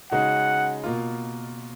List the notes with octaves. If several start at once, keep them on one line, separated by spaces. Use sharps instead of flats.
C#3 G#3 D#4 F#4 F#5
B2 A#3 F4